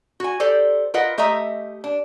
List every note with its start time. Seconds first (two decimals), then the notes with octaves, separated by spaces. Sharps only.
0.20 F#4 G#5
0.40 G4 A4 C5 D5
0.94 F4 A#4 B4 D#5 F#5
1.18 A3 G4 D#5 E5 A#5
1.84 D4